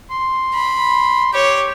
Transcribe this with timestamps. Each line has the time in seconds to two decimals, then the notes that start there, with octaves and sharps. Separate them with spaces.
0.11 C6
0.54 B5
1.33 G4 C#5